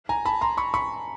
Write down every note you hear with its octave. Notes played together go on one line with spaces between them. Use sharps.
G#5 A#5
A5 B5
A#5 C6
B5 C#6
B5 C#6